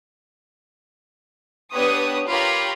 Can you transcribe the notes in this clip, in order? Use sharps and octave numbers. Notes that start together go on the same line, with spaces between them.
B3 D4 G4 B4 C#5 D#6
F4 G4 A#4 C#5 A#5 B5